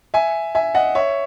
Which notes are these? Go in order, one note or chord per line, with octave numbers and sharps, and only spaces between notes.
E5 G#5
E5 G#5
D#5 F#5
C#5 E5